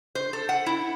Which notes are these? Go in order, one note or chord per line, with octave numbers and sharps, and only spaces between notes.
C5
A4
F#5
E4